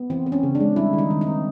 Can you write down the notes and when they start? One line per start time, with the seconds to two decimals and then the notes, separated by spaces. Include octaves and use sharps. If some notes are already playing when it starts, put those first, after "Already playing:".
Already playing: B3
0.10 E3 C4
0.26 C4
0.32 C#4
0.43 C#3
0.55 D4
0.60 G#3
0.76 G3 E4
0.93 D#3
0.98 D#4
1.10 D#3
1.21 D#4
1.27 C4